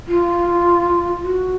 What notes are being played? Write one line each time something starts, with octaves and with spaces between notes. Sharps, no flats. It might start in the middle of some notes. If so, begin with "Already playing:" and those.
F4
F#4